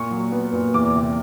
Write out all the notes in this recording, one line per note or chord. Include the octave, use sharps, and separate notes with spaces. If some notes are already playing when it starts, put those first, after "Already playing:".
Already playing: A#2 C#6
F#3
B3
A#2
E2 D6
C3